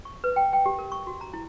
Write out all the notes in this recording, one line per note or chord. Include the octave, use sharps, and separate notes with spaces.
C#6
B4
G5
G5
G4
A#4
C#6
F#4
A#5
E4